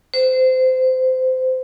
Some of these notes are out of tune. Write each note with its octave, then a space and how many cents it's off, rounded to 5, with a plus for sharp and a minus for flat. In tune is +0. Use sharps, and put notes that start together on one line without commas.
C5 -20